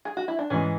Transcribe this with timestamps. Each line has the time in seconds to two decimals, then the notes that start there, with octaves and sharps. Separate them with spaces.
0.05 G#4
0.17 F#4
0.28 E4
0.39 D4
0.50 G#2 E3 G#3 C#4